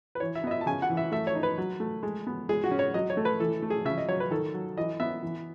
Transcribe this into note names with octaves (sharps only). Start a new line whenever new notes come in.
B4
E3 C#5
E5
B3 D#5
E5
A5
C#3 G#5
F#5
E3
E5
A3 E5
C#5
D#4
B4
F#3
A3
G#3
B3
G#3 G#4
F#4
C#4
C#5
F#3 D#5
C#5
A3
B4
E3 A4
A3
G#4
C#3 E5
D#5
F#3 C#5
B4
D#3 A4
F#3
E3 D#5
B3 E5
E3